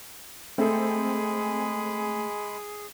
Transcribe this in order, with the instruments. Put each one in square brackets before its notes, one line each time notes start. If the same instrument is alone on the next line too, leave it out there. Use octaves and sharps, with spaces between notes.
[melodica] G#3 B5 [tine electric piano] A3 [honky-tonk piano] C4 A4 [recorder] G#4